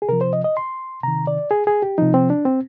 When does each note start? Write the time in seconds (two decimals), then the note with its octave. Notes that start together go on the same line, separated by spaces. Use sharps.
0.02 G#4
0.09 C3 F3 A#4
0.21 C5
0.33 D#5
0.44 D#5
0.57 C6
1.03 C3 D#3 A#5
1.27 D5
1.51 G#4
1.67 G#4
1.82 G4
1.98 C3 F3 D#4
2.14 C4
2.30 D4
2.45 C4